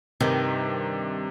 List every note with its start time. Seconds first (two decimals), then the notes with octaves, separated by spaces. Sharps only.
0.21 G2 C3 D#3 G4